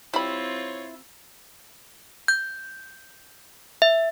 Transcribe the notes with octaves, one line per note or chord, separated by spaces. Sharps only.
G3 C4 E4 F4 C#5 B5
G6
E5